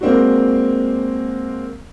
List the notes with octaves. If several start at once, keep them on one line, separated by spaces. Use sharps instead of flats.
G#3 A#3 C4 D4 F#4